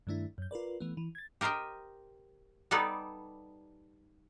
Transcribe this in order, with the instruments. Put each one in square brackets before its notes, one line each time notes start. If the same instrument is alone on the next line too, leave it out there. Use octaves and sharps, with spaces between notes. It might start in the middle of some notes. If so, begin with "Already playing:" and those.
[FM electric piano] G2 D#3 A3 D4 E4
F#2 G6
F4 A#4 B4 D5
E3 A3 B3
E3
G#6 A6
[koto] G4 A#4 C5 D#5 G5
G3 B3 D#4 A4 B4 D5